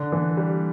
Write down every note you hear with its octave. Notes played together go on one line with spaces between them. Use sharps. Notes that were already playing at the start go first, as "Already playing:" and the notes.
Already playing: D3
E3
G3